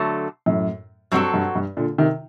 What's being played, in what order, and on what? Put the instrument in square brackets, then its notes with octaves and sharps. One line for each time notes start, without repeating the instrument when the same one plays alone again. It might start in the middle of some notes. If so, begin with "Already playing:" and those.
Already playing: [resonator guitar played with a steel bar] D3 F#3 A3
[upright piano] F#2 A2
[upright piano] G2 [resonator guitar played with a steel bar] F#3 C4 F#4 A4
[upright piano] G2
G2
A#2 D3
C3 D#3